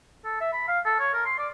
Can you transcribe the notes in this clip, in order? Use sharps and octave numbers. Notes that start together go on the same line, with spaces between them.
A4
E5
B5
F5
A4
C#5
A#4
C6
D5